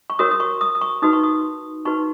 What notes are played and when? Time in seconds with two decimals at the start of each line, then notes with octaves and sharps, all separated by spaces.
0.10 C#6
0.19 F#4 A#4 C#5 D#6
0.31 D#6
0.40 C#6
0.61 D#6
0.75 D#6
0.81 C#6
1.02 D#4 F#4 B4 D#6
1.13 C#6
1.23 D#6
1.85 D#4 F#4 B4 C#6